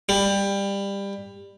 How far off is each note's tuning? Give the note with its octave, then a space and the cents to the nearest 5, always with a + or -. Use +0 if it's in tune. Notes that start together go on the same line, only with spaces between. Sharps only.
G3 +20